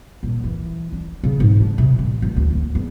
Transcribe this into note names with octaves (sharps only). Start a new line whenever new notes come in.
D#1
E3
D4
C#3
G#2
D4
C3
A1
D1
D2
D#2
E2